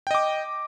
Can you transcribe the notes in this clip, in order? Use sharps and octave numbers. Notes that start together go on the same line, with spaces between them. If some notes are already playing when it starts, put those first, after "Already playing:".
D#5 G5 D6